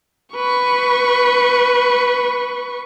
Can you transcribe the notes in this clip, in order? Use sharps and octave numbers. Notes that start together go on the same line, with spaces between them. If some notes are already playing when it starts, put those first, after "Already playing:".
B4 C#6